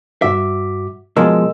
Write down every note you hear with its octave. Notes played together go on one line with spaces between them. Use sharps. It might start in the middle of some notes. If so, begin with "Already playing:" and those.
G2 F#4 E5 D6
B2 F3 G#3 A#4 D#5 E6